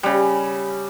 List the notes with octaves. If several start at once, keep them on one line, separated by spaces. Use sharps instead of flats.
C#3 G3